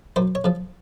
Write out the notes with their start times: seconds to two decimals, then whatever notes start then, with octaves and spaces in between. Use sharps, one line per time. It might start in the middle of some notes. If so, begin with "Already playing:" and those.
0.16 F#2 C5
0.35 C#5
0.44 C#3 F3